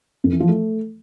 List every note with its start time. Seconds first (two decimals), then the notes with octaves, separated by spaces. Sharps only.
0.24 F2
0.32 E3
0.40 F3
0.49 A3